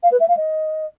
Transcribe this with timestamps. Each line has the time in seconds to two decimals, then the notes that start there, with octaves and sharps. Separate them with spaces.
0.03 F5
0.12 B4
0.20 E5
0.29 F5
0.37 D#5